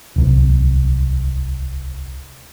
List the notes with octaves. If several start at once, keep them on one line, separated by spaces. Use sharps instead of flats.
D1 C2